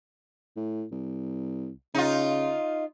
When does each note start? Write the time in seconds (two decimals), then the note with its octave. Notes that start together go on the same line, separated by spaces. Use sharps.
0.56 A2
0.91 C2
1.95 C#3 D#4 F4